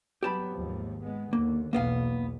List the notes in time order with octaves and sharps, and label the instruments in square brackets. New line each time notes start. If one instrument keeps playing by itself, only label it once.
[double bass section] F#3 G3 B3 [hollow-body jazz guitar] G4 A5 B5
[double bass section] G#1 D#2 F3
G#3 B3
[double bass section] D#2 D3 [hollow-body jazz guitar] A#3
[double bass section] B1 E2 B2 [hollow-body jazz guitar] A#3 B3 F5